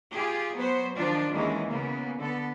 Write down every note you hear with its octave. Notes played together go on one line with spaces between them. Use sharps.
F4 G4 G#4
F#3 B3 C5
D#3 F3 D4 F4
D#2 D#3 E3 G#3 C#4
C#3 A#3 B3
D3 B3 A4